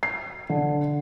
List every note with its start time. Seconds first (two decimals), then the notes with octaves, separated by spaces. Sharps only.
0.03 C7
0.49 D3